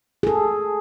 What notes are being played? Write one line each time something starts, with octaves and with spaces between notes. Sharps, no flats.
G#4 A4